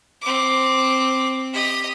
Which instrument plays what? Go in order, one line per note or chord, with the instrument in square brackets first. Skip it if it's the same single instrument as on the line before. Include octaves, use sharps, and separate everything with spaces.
[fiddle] C4 D6
G4 D#5